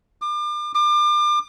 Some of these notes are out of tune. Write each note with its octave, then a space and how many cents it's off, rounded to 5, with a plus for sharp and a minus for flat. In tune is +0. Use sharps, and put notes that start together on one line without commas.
D6 +35
D6 +35